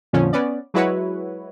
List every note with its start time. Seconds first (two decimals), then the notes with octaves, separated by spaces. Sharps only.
0.13 F2 A#2 D3 F3 C#4
0.33 B3 C#4 D5
0.74 F#3 G#3 E4 F#4 B4 C#5